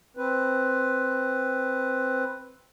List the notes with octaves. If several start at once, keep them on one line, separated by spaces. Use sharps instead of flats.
C4 B4